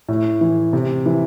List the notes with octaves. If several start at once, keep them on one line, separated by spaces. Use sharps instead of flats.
A2
E3
C3
E3